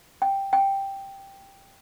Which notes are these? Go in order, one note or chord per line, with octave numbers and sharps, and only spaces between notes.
G5
G5